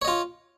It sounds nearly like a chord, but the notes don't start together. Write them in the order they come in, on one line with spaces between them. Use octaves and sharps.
C#5 D#5 F4